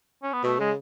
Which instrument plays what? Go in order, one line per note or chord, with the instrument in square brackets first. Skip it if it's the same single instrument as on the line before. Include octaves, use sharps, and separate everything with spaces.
[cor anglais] C#4
B3
[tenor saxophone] B2 [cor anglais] A3
[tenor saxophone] C#3 [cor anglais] G#3